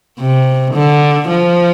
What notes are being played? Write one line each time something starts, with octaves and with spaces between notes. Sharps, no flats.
C3
D3
F3